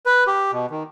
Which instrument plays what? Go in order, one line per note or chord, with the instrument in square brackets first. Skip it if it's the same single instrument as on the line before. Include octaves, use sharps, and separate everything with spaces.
[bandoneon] B4
G4
B2
D#3